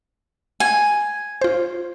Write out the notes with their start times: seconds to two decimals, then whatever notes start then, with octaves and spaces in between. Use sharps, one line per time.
0.60 G#5
1.41 F4 C5